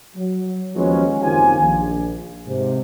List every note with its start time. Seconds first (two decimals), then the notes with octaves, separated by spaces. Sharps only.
0.16 F#3
0.75 D#2 F3 F#3 G#3 B3 C#4
1.21 F#1 D#3 C4 F4 G4 G#5
1.60 A#1
2.47 G#2 C3